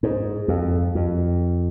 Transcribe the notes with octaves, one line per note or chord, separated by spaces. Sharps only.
G#2
F2
F2